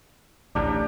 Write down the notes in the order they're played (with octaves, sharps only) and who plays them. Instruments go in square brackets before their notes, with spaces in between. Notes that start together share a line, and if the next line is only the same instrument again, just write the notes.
[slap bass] A1 D2 [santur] D4 G4 A#5